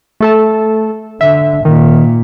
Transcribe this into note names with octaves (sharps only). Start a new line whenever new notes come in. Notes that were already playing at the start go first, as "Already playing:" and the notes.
A3 A4 A5
D3 E5
A#2 D#3